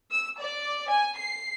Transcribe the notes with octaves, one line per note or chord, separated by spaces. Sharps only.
E6
D5
G#5
C7